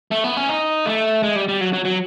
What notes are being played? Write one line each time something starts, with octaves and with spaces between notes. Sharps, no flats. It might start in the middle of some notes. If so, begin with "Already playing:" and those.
A3
B3
C#4
D#4
A3
G#3
G3
G3
F#3
F#3
F#3